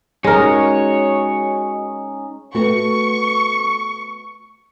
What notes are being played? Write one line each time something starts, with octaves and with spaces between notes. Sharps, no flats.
G#3 C#4 D#4 F#4 A#4 C#5 D#5
A3 B3 F#4 C#6